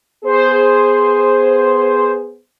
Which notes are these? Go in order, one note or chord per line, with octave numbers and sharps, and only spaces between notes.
B3 G#4 C5